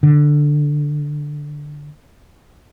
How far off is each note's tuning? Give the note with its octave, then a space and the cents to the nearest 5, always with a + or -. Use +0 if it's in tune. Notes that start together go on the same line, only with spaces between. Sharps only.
D3 +5